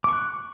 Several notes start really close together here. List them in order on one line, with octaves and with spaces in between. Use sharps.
D6 C#6 F#6